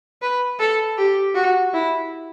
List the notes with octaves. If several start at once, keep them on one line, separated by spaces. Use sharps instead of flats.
B4
A4
G4
F#4
E4